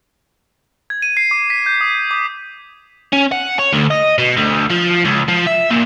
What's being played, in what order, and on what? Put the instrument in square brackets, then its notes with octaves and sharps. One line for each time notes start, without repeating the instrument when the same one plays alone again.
[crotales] G#6
D#7
C7
D6
B6
G6
D#6
D6
[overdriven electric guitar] C#4
F#5
C#5
D2
D#5
B2
D2
F3
C#2
F3
E5
A#2